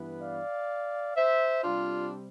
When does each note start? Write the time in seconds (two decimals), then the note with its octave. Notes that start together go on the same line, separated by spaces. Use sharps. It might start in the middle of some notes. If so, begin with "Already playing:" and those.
Already playing: G2 E3 B3
0.21 D5 F5
1.16 C5 E5
1.63 C3 G3 C4 D4 F4